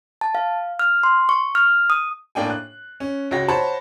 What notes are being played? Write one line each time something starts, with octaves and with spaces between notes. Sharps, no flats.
A5
F5
F6
C6
C#6
F6
D#6
A2 A#3 D4 G5 G#5
F#6
C#4
C#2 F#4 C#5 G5 A#6
C5 C#5 F#5 A5 B5